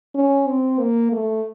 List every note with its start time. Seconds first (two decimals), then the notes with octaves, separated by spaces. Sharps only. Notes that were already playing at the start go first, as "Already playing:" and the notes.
0.15 C#4
0.47 C4
0.80 A#3
1.12 A3